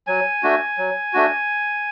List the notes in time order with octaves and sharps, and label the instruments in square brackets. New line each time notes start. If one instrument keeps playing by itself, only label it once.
[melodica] F#3 G#5
A3 D4 F#4
F#3
A3 D4 F#4